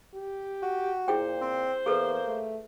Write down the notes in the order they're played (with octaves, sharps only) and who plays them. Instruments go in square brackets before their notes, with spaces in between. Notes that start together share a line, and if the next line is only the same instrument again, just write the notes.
[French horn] G4
[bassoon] F#4
[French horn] A#2 [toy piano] E4 G#4 G5 [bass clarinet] C5
[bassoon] C4
[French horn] E2 [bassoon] A#3 [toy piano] G#4 A4 B4
[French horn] A3